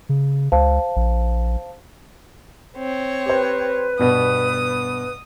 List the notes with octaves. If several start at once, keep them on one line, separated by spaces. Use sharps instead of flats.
C#3
C#2 C5 F5 A5
A#1
C4 C#5
G4 B4 C5
G2 B2 B3 D#6